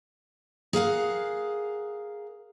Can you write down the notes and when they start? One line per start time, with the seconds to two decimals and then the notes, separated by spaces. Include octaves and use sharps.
0.73 G#4 A#4 F5 F#5